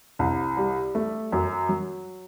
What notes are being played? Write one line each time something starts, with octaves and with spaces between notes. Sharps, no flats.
C2
G3
A3
F#2
F#3